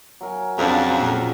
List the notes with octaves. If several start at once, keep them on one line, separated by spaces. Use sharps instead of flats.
F#3 A#4 G#5
F2 C#3 F#3 C#4 D4
A#2